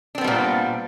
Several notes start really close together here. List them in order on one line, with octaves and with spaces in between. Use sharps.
D4 C4 B3 G3 A#2